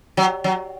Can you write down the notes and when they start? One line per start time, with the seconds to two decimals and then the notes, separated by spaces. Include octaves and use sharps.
0.17 F#3
0.44 F#3